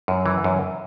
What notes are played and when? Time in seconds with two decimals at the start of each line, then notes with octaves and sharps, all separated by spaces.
0.08 F#2
0.26 E3
0.44 F#2